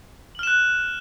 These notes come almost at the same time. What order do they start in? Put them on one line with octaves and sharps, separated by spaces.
F#7 F6 E7 F#6